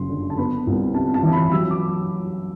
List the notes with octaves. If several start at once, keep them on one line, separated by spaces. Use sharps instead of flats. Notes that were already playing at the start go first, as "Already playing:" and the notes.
Already playing: F#1 F#2 C6
D3
A5
B3 B5
C2
C3 A5
A5
E3
B5
F#3 E6
D6